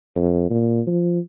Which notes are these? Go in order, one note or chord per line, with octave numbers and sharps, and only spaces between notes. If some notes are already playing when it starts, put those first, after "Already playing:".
F2
A#2
F3